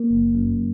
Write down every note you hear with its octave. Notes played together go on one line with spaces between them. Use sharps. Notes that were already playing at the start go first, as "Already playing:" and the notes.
Already playing: A#3
F#1
F#2